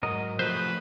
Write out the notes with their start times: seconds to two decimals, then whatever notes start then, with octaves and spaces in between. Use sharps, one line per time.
0.03 G#2 F#3 A#4 D#5
0.39 F3 A3 B4 C5